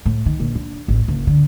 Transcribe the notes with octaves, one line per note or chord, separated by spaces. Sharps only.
A2
D#3
A#1
D4
A1
F#1
D3